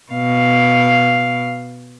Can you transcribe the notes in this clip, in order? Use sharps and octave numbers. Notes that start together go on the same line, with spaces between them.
B2 F5